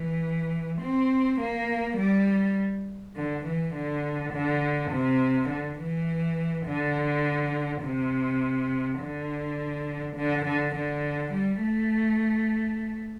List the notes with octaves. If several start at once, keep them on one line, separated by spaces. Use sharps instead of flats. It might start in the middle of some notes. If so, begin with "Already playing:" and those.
Already playing: E3
C4
A#3
G3
D3
E3
D3
D3
C3
D3
E3
D3
C3
D3
D3
D3
D3
G3
A3